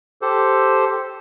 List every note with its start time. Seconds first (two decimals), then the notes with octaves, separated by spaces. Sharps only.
0.22 G4 A4 C5